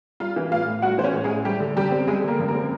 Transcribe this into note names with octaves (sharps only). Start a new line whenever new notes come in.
G3 F4 F5
E3
A2 F4 F5
A2
G3 F#4 F#5
E3 C5
C#4 C#5
A2
G#3 G#4
A2
G3 G4
D3
F#2 G3 G4
C4
G3 G#3 G#4
D3 A#3 A#4
F#2
A#3 A#4
C4